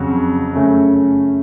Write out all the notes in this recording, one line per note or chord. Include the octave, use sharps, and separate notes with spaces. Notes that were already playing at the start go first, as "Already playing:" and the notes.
Already playing: F2 C#3 F#3
F#2 C#3 A3 C#4